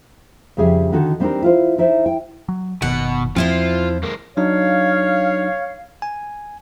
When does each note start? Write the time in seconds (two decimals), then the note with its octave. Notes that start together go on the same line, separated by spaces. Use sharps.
0.57 F2 C#3 G3 G4 G#4 E5
0.92 D3 D#3 D#4 F#4 A4
1.20 G3 C4 D4 D#4 G4 A#4
1.42 E4 F4 C5
1.78 D#4 E4 C5 E5
2.06 G5
2.49 F#3
2.82 F#1 B2 D#3 F#5
3.36 E2 F3 C4 E4 F4 C5
4.04 G#3 A#3
4.37 F#3 D4 D#4 C#5 F5
6.02 G#5